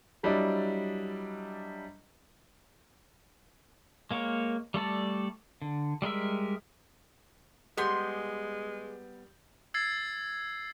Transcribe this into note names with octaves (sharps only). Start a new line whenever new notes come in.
F#3 G3 D4 E4 D5 D#5
G#3 A#3 A#4 C#5
G3 A3 A4 D5
D3
G3 G#3 A#4 E5
G3 G#3 B3 G#4 C6 G6
E6 G#6 A6 C7